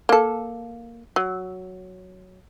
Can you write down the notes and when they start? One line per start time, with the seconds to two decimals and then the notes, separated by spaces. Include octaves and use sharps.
0.09 A#3 A4
1.16 F#3